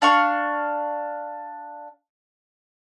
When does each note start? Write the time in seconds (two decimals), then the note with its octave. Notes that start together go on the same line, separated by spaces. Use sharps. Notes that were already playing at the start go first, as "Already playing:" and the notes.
0.02 D4 F5 C#6